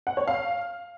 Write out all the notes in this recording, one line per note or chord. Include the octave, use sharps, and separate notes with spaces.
F#5
C#5
F5